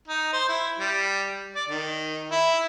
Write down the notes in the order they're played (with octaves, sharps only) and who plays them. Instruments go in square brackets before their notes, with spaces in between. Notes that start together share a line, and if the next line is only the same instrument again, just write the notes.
[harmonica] D#4
C5
E4
G3
D5
D#3
E4